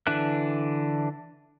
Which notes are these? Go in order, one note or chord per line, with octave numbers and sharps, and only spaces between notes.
D3 E3 D4 E5 F#6